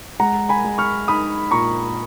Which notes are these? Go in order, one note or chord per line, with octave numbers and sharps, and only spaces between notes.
G#3 F#5 A#5
G#5 B5
G#3
C#6 F6
D#4 B5 D#6
A#2 A#5 C#6